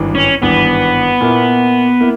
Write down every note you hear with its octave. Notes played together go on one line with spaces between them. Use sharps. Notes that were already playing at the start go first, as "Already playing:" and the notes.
Already playing: G#1 G2 E3
C#4
G#1 G2 E3 B3
A#2 A#3 E4
A#3 E4